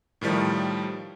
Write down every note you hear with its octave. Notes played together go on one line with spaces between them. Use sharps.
A2 D#3 F3 G3